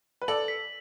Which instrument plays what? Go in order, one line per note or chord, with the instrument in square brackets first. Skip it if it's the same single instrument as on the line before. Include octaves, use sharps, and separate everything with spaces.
[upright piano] B4
[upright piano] A4 D5 [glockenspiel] F#7
[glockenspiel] B6